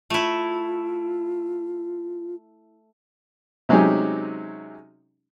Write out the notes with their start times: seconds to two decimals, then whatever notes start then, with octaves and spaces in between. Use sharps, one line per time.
0.10 A3 E4 F4
3.69 C3 F#3 G#3 C#4 D#4 G4